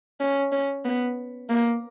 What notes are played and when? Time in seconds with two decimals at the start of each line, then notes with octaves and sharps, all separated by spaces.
0.20 C#4
0.52 C#4
0.85 B3
1.50 A#3